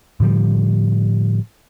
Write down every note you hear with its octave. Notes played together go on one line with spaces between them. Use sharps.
A2 D3 F3 G3